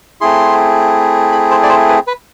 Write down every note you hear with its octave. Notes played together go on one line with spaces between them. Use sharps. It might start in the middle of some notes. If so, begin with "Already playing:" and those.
A3 C4 E4 G#4 C6
B5
C5
D5
C5
B4
B4